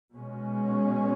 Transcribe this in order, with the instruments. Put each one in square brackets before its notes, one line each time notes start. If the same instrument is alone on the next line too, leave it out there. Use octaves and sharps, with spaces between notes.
[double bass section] B2 G#3 C#4